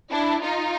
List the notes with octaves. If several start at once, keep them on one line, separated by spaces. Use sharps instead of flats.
D4 E4
D#4 F4